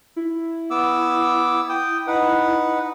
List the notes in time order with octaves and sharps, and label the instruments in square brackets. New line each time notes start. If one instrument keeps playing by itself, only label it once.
[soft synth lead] E4
[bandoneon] B3 D6 E6
G5 D#6
D#4 B4 F#5